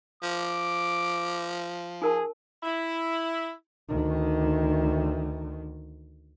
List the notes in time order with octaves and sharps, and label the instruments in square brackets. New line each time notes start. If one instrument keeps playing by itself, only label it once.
[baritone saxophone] F3 [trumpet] D6
[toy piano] D#4 A#4 A5 [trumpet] G#4
[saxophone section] E4
[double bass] D2 D#3